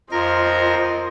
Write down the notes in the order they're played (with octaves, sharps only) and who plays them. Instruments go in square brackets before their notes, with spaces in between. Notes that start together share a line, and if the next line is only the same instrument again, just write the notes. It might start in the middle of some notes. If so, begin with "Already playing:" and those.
[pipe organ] F2 A#4 A#6 [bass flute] F4 [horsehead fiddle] C5 D#5 [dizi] A#5